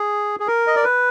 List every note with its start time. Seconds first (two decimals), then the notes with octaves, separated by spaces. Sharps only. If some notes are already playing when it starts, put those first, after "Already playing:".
Already playing: G#4
0.40 G#4
0.47 A#4
0.67 D#5
0.76 D5
0.84 B4